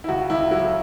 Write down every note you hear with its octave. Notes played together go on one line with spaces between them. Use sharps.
E4
C#2 F#4
C#2 E4
F#3 E4